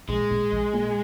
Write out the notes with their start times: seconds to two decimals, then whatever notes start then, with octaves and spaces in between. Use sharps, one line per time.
0.08 A#1 G#3
0.31 A#1
0.52 A#1
0.74 A#2